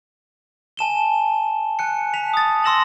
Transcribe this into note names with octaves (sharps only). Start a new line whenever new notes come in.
G#5 A5 E7 G7
G#5 F#6 C#7
A5 B6 F7
D#6 A6
C6 E6 A#6 E7 F#7